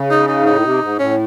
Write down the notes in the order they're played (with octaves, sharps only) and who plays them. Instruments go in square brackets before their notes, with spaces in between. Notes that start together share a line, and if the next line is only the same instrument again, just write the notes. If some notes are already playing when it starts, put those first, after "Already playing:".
Already playing: [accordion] C#3
[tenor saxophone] D#4
D#4
[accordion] G#2
[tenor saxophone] D#4
[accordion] A2
C3
G#2
[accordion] A2 [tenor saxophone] C#4